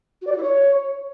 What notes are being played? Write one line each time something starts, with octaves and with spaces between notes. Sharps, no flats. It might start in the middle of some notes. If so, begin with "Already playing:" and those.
F#4
D5
F#4
E4
C#5